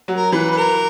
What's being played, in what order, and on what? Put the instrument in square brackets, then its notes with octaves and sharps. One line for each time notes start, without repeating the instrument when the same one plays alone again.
[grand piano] F#3
[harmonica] A#4
[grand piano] E3 [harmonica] B4
[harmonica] B4
A#4